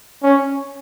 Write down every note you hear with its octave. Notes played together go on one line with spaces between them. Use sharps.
C#4